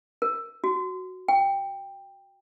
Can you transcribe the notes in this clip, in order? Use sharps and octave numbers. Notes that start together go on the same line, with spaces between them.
A#4
F#4
G5